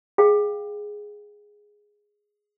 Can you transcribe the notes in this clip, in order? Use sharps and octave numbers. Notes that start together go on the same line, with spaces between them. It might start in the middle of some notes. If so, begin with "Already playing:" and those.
G#4 F5 G5